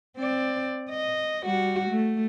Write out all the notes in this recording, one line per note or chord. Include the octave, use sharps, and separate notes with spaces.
C4 D5
D#5
G3 F#4
A3